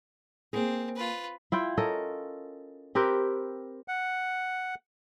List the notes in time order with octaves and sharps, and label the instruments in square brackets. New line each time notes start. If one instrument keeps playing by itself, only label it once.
[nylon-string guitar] A#3 G#4 [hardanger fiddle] C4
[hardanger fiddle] F4 B4
[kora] E4 F4 G5
C#4 A4 A#4 D#5
C4 G4 A#4 B4
[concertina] F#5